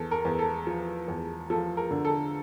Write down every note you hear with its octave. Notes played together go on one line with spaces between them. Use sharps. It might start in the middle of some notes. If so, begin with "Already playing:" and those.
Already playing: E2 A4
A#4
E2
A4
F3
E2
F3 A4
A#4
D3
A4